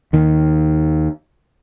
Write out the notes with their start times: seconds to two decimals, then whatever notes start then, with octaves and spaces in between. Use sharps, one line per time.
0.13 D#2 D#3